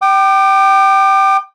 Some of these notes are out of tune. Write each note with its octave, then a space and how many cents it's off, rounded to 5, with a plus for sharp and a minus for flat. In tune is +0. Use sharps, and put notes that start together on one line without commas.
G5 -20 D6 +35